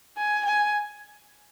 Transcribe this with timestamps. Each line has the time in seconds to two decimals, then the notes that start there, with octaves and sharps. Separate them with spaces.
0.17 G#5
0.46 G#5